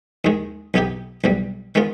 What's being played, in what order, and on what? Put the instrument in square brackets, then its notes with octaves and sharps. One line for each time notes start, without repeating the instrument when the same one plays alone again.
[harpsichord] D#2 D#3 G#3
B1 B2 B3 D#4 G4
B1 B2 G3
D#3 G#3 B3 F4